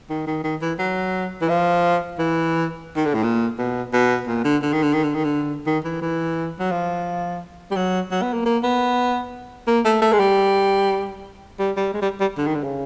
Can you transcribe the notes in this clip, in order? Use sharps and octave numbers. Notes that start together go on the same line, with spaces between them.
D#3
D#3
D#3
E3
F#3
E3
F3
E3
D#3
D3
A2
A#2
B2
B2
A#2
D3
D3
D#3
D3
D#3
D3
D#3
D3
D#3
E3
E3
F#3
F3
G3
F#3
F#3
B3
A#3
A#3
B3
A#3
A3
A3
G#3
G3
G3
G3
G#3
G3
G3
D3
D#3
D3
C#3